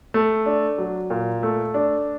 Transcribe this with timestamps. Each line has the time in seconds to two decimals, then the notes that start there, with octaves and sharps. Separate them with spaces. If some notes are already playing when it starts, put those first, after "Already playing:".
0.14 A3
0.46 D4
0.78 F#3
1.10 A#2
1.43 A3
1.74 D4